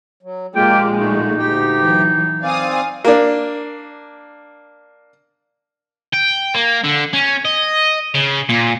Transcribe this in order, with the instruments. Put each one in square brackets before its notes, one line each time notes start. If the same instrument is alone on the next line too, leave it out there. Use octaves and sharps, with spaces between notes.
[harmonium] F#3
[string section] A#1 A#2 G#3 [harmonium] A#3 F4 G4 [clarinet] G5
[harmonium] A3 F#4 [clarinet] D#4
[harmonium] D2 G4 G5
[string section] E3 F#3
[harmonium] C4 D5 [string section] F5 G#5 D#6
[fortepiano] A#3 D4
[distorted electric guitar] G5
A#3
D3
C#4
D#5
C#3
A#2